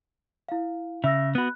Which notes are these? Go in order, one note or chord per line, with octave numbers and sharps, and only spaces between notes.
E4 F5
C#3 E5 E6 A#6
B3 F#4 B5 F#6